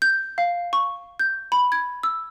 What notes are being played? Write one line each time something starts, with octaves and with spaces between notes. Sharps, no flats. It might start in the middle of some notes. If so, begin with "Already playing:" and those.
G6
F5
C#6
G6
B5
G#6
E6